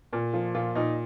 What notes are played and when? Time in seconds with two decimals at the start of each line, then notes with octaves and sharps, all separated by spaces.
0.13 A#2
0.33 F3 F4
0.55 A#2 F4
0.75 A#2 D#4